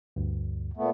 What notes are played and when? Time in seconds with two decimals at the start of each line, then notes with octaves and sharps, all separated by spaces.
0.16 D2 G2
0.77 A#2 A3 B3